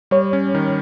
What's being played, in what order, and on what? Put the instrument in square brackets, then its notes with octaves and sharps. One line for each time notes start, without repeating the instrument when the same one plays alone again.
[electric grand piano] G3 [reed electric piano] C#5
[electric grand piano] C#4
D#3